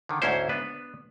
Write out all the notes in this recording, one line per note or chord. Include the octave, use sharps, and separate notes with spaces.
D3 D#3
D2 G#2 C#4 E4 C5
B3 D4 B4